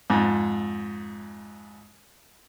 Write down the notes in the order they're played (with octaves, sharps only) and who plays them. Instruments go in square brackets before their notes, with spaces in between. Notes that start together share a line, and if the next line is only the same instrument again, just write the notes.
[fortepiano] F2 G#2